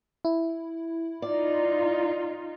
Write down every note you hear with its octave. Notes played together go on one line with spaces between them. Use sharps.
E4
D#4 F4 D5